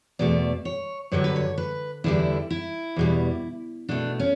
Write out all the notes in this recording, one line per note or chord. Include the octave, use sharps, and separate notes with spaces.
E2 B2 A3 D5
C#5
G2 D3 F#3 C#5
B4
C#5
B4
E2 D3 G3 E4
E4
E2 B2 G3
B2 A3 D4
C#4